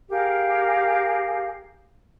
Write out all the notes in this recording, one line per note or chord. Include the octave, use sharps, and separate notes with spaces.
G4 G#4 A#4 F5